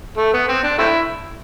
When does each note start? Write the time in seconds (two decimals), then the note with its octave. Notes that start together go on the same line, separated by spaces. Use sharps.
0.17 A3
0.33 B3
0.48 C4
0.63 D4
0.78 A3 C4 E4